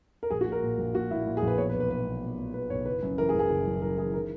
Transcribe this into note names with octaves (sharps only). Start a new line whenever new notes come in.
A#4
A#1 G#4
F#4
A#2
A#4
A#2
A#1
A#2 F#4
A#2 E4
A#2
G#4
A#1
B4
B2 C#5
B4
B1
B4
B1 B4
B2
B2
B2
B2 B4
B1 C#5
F#1 B4
F#2
E3 A#4
G#4
F#2
G#4
F#1
F#2
F#2 A#4
E3 G#4
D#3 A#4